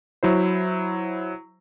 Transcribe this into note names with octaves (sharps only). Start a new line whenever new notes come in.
F#3 E4 C5